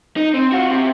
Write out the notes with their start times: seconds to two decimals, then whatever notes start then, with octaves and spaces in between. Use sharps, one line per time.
0.17 D#4
0.34 C4
0.53 F4 F#4
0.71 C3